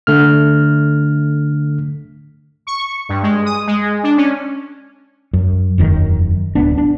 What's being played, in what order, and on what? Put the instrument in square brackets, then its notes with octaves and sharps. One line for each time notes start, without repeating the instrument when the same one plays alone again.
[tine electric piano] D3 A3 F6
[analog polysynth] C#6
G2
G#3
D#6
G#3
D4
C#4
[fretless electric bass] F#2
E1 F#2 D#3
D1 G#1 B3 D4
D4